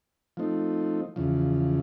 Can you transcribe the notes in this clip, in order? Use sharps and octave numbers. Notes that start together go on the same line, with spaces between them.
F3 A3 C4 D#4
E2 C#3 F3